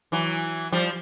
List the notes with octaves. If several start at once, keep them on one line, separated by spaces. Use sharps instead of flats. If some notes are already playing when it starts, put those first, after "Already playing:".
E3 F#3
F3 G3